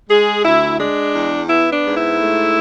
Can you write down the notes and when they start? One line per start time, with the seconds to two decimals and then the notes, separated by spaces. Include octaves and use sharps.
0.09 G#3 G#4
0.45 D2 E4
0.79 G#3 D4
1.14 E2
1.49 B3 E4
1.72 D4
1.85 G#2
1.96 E4
2.19 A3